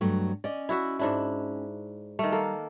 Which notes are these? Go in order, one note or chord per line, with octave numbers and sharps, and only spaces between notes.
G2 F#3 A3
C#4 D5 D#5
E4 F#4 E5
G#2 D4 E4
D#3 G3 A3
A#3 A4